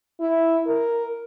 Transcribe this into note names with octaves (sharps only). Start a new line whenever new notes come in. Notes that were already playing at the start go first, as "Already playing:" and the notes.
E4
A#4